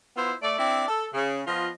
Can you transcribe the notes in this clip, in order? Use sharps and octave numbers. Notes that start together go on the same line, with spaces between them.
B3 E4 F4 C5
A3 D5
C4 D4 E4 D5
A4
C#3
F3 B3 F4 D#5